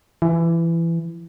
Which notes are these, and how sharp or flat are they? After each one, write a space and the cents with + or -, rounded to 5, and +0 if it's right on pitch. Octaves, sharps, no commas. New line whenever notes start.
E3 +20